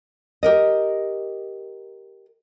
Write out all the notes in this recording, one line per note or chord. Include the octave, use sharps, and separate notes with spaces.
G4 A#4 D#5